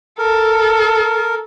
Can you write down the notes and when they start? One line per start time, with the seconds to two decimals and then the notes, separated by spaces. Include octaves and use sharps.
0.19 A4 A#4